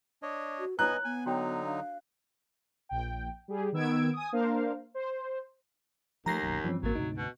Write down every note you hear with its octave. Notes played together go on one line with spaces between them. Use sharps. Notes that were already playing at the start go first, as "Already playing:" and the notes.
D4 C#5 D#5
F#4
B3 E4 B4 C#5 D#5 G#5 A#5 F#6
B3 G#5
D3 F#3 D#4 F#4 C#5 G5
D4 F5
A#1 G5
G3 G4 G#4
D#3 B3 E6 G#6 D7
G#5 D#6
A#3 D4 A#4 C5 F5
C5
D#2 F3 A3 A#5 A#6 C7
D#1 B1 F#2
G2 E3 F3 C4 C#4
A1 F#3 A#3
D2 G#2 C3 D#4
B2